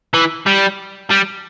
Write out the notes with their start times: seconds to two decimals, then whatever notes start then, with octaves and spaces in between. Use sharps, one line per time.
0.14 E3
0.47 G3
1.11 G3